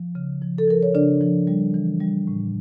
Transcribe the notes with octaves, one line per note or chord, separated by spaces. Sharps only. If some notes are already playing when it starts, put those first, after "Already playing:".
Already playing: F3
C#3
F3
A4
F3 A#4
C#5
C#3 D4 D5
F3
G3
E3
G3
A2